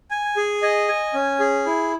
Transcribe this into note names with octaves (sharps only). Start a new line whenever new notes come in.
G#5
G#4
D#5
G#5
C#4
G#4
E4